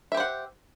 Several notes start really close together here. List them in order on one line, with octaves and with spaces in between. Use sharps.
E5 G4 C5 F#5